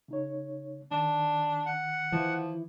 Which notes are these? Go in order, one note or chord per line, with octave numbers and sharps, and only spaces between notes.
C#3 D#4 C#5
D#3 D4
F#5
E3 F3